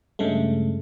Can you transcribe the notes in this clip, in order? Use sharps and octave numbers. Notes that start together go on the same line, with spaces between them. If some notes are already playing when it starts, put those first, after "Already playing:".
G2 C#3 G#3 A3